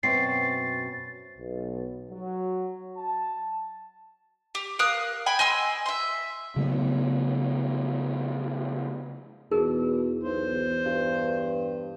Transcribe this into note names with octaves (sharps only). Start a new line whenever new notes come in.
F#2 B2 C4 A6 C7
B1
F#3
A5
G4
A#4 F5 D#6 F#6
G5 G#5 B5
D#5 G#5 C6 E6
E5 C6
C#3 F#3 A3 B3
E2 B2 D#4 G#4 A#4
B1 C5
G2